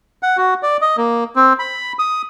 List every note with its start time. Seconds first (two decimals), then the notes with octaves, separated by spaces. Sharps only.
0.23 F#5
0.37 F#4
0.63 D5
0.81 D#5
0.97 A#3
1.36 C4
1.59 B5
1.99 D#6